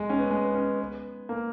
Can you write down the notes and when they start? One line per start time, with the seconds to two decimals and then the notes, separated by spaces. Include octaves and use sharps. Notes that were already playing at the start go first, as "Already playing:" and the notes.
Already playing: G#3
0.10 C#4
0.19 B3
0.31 G#3
0.45 B3
0.54 C#4
0.80 B3
1.29 A#3